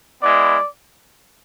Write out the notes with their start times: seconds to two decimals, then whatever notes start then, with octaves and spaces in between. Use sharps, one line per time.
0.23 G#3 B3 E4 D5